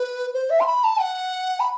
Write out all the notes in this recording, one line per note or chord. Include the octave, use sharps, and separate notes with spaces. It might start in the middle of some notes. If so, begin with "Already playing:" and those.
Already playing: B4
C5
E5
C6
B5
A5
F#5
B5